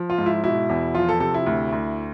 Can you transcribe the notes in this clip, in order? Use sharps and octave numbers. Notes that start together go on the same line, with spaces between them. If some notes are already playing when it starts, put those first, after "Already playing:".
Already playing: F3
F4
G#2
E4
B2 E4
E2
F3 F4
A4
C3 A4
E4
D2
D2